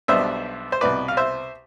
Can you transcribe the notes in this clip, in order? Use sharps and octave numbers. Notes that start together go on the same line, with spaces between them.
B1 B2 G3 B3 D4 C5 E5
C5
C2 B2 B3 E4 B4 D5
F5
C5 E5